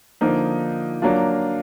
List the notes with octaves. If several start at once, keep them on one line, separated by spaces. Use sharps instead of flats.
D3 F3 A#3 D#4
F#3 A#3 D4 F4